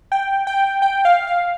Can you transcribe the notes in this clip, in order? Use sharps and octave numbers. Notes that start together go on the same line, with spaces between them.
G5
G5
G5
F5
F5